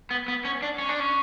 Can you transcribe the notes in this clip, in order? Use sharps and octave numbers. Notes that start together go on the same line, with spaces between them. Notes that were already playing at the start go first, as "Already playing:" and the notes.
B3
B3
C#4
D4
C#4
D4
C#4